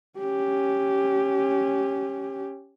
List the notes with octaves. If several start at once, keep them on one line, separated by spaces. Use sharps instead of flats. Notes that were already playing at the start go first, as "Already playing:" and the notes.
C#4 G4